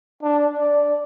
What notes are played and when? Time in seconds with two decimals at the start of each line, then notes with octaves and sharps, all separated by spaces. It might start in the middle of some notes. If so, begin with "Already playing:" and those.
0.23 D4
0.59 D5